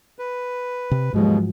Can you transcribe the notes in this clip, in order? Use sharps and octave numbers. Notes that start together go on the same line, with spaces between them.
B4
C3
D#2 G#2 B2 F3 F#3 G#3